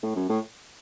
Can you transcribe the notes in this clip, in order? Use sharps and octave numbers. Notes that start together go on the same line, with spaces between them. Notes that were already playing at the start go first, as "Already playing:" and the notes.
A2
F#2
A2